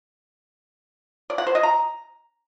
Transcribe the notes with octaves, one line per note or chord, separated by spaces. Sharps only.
D5
F#5
C5
D#5
A#5